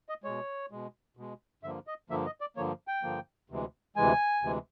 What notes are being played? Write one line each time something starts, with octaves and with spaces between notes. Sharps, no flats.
D#5
B2 G#3 C#5
B2 G#3
B2 G#3
G2 D3 F3 A#3 E5
D#5
G2 D3 F3 A#3 E5
D#5
D5
G2 D3 F3 A#3 C#5
G5
G2 D3 F3 A#3
D2 C3 E3 G#3
D2 C3 E3 G#3 G#5
D2 C3 E3 G#3